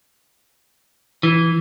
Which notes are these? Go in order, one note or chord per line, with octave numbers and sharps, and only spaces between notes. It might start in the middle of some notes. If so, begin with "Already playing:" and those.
E3